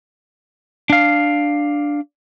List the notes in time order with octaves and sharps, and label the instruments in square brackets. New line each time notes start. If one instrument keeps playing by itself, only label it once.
[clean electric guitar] D4 F5